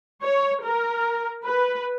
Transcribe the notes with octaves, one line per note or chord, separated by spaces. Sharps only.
C#5
A#4
B4